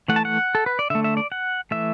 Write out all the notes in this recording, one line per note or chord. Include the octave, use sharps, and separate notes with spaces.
E3 A3 F#5
A5
F#5
A4
B4
D5
D3 A3 E5
E5
D5
F#5
E3 A3 E5